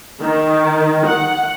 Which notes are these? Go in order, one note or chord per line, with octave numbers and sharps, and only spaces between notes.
D#3
F#5